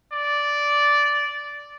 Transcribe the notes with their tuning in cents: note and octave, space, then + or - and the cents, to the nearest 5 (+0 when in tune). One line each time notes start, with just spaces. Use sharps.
D5 -10